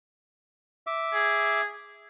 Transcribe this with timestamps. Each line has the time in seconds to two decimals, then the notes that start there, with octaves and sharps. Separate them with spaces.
0.87 E5 D6
1.14 G#4